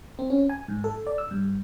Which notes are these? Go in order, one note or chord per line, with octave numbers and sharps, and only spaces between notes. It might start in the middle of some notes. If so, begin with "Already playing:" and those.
C4
C#4
G#5
G#2
A4
D5
E6
G2